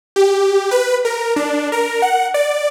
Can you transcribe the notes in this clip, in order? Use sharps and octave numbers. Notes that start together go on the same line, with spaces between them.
G4
B4
A#4
D4
A#4
F#5
D5